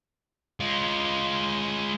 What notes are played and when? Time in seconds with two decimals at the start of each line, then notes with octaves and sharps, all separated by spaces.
0.60 G#3 F4